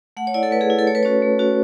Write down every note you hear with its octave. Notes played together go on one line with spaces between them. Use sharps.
A3 F#5
C#5
E4 D5
A4
A3 B4
G#4
E4
A4
A3 C#5
B4
C#4 F#4 C#5
A3
C#4 F#4